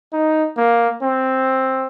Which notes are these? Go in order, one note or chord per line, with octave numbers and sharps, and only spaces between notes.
D#4
A#3
C4